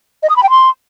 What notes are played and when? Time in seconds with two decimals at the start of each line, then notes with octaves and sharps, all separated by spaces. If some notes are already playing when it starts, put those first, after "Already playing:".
0.23 D#5
0.30 D#6
0.36 B5
0.43 G5
0.50 C6